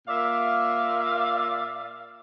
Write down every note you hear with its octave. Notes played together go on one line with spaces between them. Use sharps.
A#2 D5 E5 F5